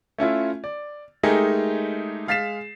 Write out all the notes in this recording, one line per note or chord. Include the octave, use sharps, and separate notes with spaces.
A3 C#4 E4 F4
D5
G#3 A3 D#4 G4 G#4 A#4
G#3 F5 A6 B6 C7 E7